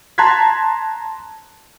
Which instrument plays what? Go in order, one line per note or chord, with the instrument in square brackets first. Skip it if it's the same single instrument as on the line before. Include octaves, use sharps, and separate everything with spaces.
[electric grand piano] A5 A#5 C6 F#6 G#6 B6